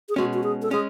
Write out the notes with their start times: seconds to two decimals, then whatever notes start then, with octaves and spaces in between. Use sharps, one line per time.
0.09 G#4
0.16 B2 G#3 C#4 F#4
0.34 F#4
0.44 G#4
0.62 A4
0.71 G#3 C#4 G#4